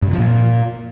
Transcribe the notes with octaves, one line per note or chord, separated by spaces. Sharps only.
G2
C3
F3
A#2